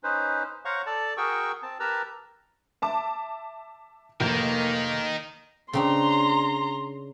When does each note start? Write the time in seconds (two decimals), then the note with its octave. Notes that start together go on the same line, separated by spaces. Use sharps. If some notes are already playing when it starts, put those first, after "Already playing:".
0.04 C#4 D#4 B4 C5
0.65 C5 C#5 F5 F#5 A#5 C#6
0.86 A4 D5 A5
1.17 F#4 G#4 A#4 G5 C#6 E6
1.63 C4 A5
1.80 G4 A#4 B4 A5 A#5 E6
2.82 E5 A5 D6
4.20 F1 D#3 A#3 G6
5.73 C#3 C4 D4 A#5 C6